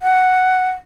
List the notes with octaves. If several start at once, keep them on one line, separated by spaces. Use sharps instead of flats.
F#5